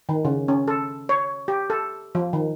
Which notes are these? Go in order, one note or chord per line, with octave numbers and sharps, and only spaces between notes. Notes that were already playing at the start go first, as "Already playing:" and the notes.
D#3
C#3
C#4
A4
C#5
G4
A4
F3
D#3